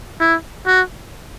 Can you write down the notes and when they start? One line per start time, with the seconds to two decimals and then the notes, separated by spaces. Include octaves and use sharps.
0.20 E4
0.67 F#4